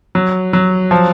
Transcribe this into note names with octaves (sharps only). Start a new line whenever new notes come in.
F#3
F#3
F3